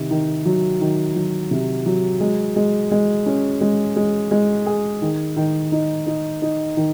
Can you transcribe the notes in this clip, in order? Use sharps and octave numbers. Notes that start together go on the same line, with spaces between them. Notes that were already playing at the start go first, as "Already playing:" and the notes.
Already playing: C3 D#3
D#3
F#3
D#3
F#3
C3
F#3
G#3
G#3
G#3
C#4
G#3
G#3
G#3
G#4
D#3
D#3
D#4
D#4
D#4
D#3